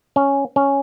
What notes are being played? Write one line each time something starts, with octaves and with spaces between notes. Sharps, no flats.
C#4
C#4